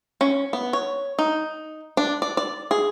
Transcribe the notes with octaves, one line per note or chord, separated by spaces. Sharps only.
C#4
B3
C#5
D#4
D4
D5
D5
G#4